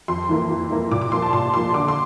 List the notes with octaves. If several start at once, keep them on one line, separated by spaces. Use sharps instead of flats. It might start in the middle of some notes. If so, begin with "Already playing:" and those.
F2 C6
E3 A#3 E4
F2
E3 A#3 E4
A#2 D6
D6
F3 A#3 C6
A5
A#2 C6
F3 A#3 C6
D3 D6
C6